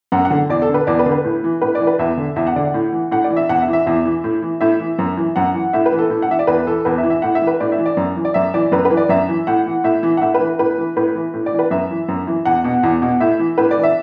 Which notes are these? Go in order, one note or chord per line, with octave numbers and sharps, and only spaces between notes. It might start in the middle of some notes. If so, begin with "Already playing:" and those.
F#2 F#5
F#5
D3
E2 D5
A4
D3
B4
E2 D5
B4
D3
B4
A2
E3
A2 B4
D5
E3
B4
E2 E5
D3
E2 E5
F#5
D3 D5
F#5
A2
E3
A2 F#5
D5
E3
E5
E2 F#5
E5
E3
E5
E2 E5
E3
A2
E3
A2 E5
E3
F#2
E3
F#2 F#5
E3
A2 E5
B4
E3
A4
A2
F#5
E3 E5
D5
E2 B4
E3 A4
E2 B4
E5
E3
E5
A2 F#5
E5
E3
B4
A2 D5
E5
E3
D5
F#2
E3
D5
F#2 E5
E3 D5
F#2 B4
B4
E3
D5
F#2 E5
E3
A2 F#5
E3
A2 E5
E3
F#5
A2 E5
B4
E3
A2 B4
E3
A2 B4
E3
A2
D5
E3
B4
F#2 E5
E3
F#2
E3
E2 F#5
B2
E2
B2
A2 E5
E3
A2 B4
D5
E3
E5